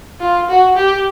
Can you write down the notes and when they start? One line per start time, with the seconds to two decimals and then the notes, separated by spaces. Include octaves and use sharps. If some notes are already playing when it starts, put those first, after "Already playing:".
0.20 F4
0.49 F#4
0.77 G4